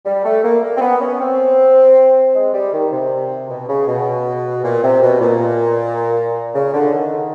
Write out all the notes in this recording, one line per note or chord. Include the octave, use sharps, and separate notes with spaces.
G3
A3
A#3
A#3
C4
B3
C#4
C4
G#3
G3
D#3
C3
B2
C#3
B2
A#2
C3
B2
A#2
C#3
D3
D#3